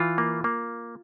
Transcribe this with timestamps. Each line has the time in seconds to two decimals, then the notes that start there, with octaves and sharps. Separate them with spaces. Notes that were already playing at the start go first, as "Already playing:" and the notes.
Already playing: E3 F4
0.18 A#3
0.44 A#3